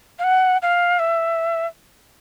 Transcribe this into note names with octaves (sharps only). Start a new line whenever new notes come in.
F5
F#5
F5
E5